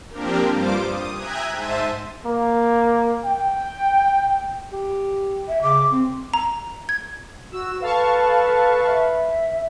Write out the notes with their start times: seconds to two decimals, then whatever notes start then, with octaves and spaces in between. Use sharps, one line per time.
0.10 F3 A#3 C4 D4 G4 A#4
0.49 G2 G3 F4 C5 D6 D7
0.85 D#6
1.15 E5 G5 G#5 A#5 F#6 G#6
1.52 G#2 C5 E5 A5 D#7
2.26 A#3
3.25 G5
4.72 G4
5.48 E5
5.62 C#3 D6
5.91 C4
6.34 A#5
6.89 G#6
7.52 F#4 E6
7.82 A4 B4 F5 A5 C#6
8.86 E5